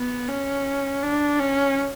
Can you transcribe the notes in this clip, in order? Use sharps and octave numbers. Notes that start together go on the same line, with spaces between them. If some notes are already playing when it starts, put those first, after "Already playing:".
Already playing: B3
C#4
D4
C#4